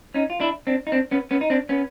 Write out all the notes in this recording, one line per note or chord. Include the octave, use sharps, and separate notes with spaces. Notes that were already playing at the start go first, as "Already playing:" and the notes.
C#4 D#4
F4
D4 E4
C4 D4
D#4
C4 D4
B3 C#4
B3 C#4
D#4
C4 D4
B3 C#4